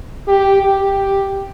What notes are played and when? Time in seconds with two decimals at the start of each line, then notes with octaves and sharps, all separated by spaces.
0.28 G4
0.63 G4